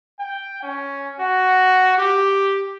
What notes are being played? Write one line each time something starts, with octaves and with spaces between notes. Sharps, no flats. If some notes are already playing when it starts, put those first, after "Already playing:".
G5
C#4
F#4
G4